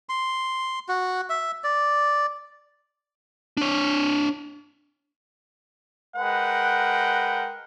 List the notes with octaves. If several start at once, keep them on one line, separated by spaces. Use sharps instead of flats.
C6
F#4
E5
D5
D4 C#5
G#3 A#4 B4 F#5 G5